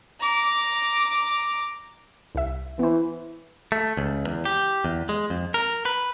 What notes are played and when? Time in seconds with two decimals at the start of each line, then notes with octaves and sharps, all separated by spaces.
0.20 A#5 D6
2.35 C2 E5
2.79 E3 B3 C5
3.72 A3
3.97 C#2
4.27 E2
4.45 G4
4.85 E2
5.09 G#3
5.30 F2
5.54 A#4
5.85 B4